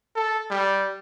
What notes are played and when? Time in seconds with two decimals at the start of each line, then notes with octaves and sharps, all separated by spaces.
0.16 A4
0.50 G3